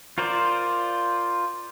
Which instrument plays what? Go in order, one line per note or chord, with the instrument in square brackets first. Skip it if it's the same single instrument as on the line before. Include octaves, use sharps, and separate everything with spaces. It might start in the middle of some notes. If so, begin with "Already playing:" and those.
[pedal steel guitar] F4 A#4 C5 D5